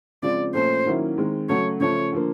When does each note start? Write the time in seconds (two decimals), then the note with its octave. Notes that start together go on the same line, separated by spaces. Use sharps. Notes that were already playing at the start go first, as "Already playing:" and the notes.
0.23 C#3 F3 G#3 C4 F4 D5
0.54 A#2 F3 A3 C#4 C5
0.86 D#3 F#3 A#3 C#4 E4
1.17 D#3 G#3 C4
1.49 C#3 F#3 A3 C#5
1.80 C#3 F3 A3 C#5
2.12 D3 F3 A#3